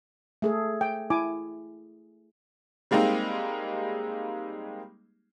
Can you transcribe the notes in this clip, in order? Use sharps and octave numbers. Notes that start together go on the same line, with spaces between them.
A3 G#4 A4
G5
E4 G#5 D6
G3 G#3 A#3 C4 D#4